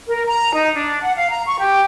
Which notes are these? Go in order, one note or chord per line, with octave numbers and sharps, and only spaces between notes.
A#4
A#5
D#4
D4
F#5
F5
A#5
C#6
G4